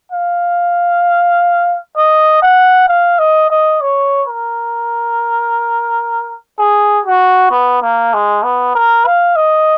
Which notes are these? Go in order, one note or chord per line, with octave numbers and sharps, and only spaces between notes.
F5
D#5
F#5
F5
D#5
D#5
C#5
A#4
G#4
F#4
B3
A#3
G#3
B3
A#4
F5
D#5